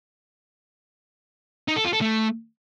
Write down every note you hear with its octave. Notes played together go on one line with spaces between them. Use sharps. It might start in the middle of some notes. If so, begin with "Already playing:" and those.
D#4
A4
F4
A4
A3